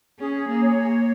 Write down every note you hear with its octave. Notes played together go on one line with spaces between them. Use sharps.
C#4 G#4
A#3
C#5
A#3